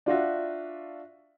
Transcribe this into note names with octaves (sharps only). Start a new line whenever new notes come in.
D4 F4 F#4 E5